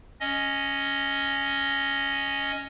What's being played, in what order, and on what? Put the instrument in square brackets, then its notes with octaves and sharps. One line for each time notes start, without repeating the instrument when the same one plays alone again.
[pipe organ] C#4 D#5